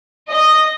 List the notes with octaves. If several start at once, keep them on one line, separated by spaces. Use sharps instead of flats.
D#5